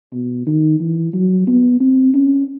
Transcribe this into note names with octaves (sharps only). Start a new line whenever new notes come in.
B2
D#3
E3
F#3
B3
C4
C#4